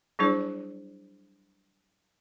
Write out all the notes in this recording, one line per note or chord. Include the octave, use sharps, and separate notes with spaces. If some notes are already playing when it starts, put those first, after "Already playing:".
F#3 G3 D4 E4 G#4 C5